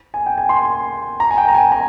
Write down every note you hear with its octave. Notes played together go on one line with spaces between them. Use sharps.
G#5
G5
G#5
C6
A#5
G#5
G5
A#5
G#5
A#5